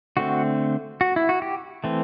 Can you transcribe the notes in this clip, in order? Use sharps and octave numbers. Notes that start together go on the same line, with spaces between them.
D3 A3 C4 F#4
F#4
E4
F#4
G4
E3 A3 C4